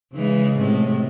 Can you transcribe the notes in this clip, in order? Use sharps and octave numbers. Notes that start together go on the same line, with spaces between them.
C#3 E3 G#3
A2 C3 G#3